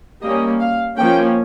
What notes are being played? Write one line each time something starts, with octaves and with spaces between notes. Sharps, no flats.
G3 A#3 C#4 D#5
F5
F3 A#3 C#4 G5